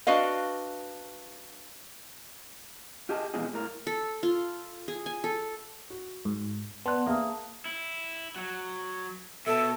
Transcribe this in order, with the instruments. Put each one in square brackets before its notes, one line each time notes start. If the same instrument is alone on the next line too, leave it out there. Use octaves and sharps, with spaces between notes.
[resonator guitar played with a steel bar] D4 F#4 B4 D#5 F5
[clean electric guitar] F4 G4 G#4 D#5 A5
B2 E3 F3 G#3 C4 G#4
A2 A#4
[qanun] A4
F4
G#4
G#5
A4
[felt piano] F#4
[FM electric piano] G#2
[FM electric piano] B3 [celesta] D5 F#5 C6 [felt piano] A5 F#6
[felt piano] A#3 G#4 F5 [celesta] E5 A5 D#6
[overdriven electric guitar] E4
F#3
[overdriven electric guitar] B2 [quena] A4 [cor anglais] E5